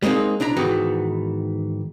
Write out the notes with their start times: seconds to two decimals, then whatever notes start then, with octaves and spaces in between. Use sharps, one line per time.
0.02 G3 G#3 A#3 C4 D#4
0.40 B1 D4 E4 A#5
0.56 G#2 D#3 E3 B3 F#4